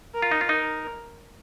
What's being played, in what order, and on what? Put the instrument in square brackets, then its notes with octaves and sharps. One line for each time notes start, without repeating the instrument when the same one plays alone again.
[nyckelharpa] A#4
[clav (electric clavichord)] F4
D#4
F4
[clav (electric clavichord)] D#4 [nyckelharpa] A#4